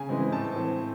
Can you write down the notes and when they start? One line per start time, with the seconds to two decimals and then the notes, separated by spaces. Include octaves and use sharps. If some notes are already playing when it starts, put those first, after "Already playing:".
Already playing: C#3 G#5
0.09 E3 G#3 C4
0.32 A2 A5
0.56 E3 C4